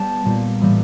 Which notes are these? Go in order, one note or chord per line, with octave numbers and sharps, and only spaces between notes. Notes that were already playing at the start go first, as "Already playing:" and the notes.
Already playing: G3 B3 G5 A5
A#2 G3 A#3
A2 E3 G3 A#3